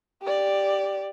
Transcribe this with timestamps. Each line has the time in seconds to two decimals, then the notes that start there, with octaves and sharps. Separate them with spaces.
0.22 G4 D5